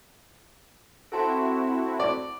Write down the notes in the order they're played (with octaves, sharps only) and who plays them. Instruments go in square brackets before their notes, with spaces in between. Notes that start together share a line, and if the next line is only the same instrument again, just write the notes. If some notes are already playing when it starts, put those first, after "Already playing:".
[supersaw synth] C4 E4 F#4 [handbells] A4 A5 C6
[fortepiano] D5